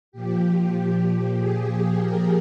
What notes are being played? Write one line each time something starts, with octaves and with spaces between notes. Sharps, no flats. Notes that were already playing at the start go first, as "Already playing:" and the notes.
A#2 F3 G4
G#4
G#4
A#4